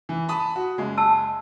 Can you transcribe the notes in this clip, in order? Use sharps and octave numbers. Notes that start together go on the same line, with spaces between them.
E3
A5 B5 D#6
F#4
F#1 G#3
A5 E6